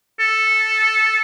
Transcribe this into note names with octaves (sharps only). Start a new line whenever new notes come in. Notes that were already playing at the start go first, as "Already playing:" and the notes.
A4